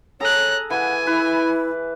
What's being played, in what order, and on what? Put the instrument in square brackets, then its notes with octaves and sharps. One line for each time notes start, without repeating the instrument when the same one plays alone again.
[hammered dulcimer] G#4 A4 A5 [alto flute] C#5 [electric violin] A#5 F#6
[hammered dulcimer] E3 B4 [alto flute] F#5 [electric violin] G#5
[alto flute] E4 [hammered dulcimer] B4